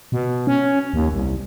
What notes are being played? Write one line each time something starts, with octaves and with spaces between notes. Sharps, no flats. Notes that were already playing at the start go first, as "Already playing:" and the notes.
B2
C#4
D#2
C2